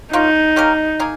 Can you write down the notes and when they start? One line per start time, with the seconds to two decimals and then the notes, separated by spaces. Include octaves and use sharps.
0.13 A#3 C#4 D#4 F4
0.56 A#3 C#4 G4 A#4
1.00 A#3 D#4 G#4